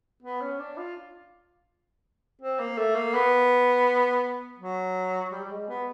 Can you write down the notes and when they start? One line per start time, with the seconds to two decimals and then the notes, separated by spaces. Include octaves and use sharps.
0.23 B3
0.41 C#4
0.59 D4
0.77 F4
2.42 C4
2.59 A#3
2.78 A3
2.95 A#3
3.14 B3
4.59 F#3
5.32 G3
5.45 G3
5.51 G#3
5.69 B3